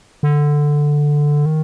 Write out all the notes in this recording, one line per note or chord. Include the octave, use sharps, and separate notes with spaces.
D3
D#3